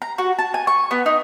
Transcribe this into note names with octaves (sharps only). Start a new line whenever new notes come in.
A#5
F#4
A5
G#5
C#6
B3
D#4